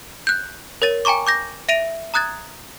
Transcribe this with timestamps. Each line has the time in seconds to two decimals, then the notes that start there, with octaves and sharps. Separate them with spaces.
0.27 F#6 G6
0.82 A#4 C#5 A6 D#7
1.05 G5 G#5 A#5 C#6 D6
1.27 D6 G6 A#6
1.69 E5 A#6 D7 D#7 F7
2.14 A#5 D#6 F#6 G#6 A6